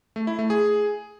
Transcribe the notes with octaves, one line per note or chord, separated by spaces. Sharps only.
A3
E4
A3
G#4